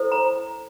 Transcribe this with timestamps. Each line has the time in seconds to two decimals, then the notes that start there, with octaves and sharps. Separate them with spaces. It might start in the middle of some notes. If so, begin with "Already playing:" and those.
Already playing: E4 A4 C5
0.12 A#5